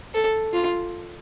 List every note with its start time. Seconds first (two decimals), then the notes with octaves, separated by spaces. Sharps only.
0.14 A4
0.53 F4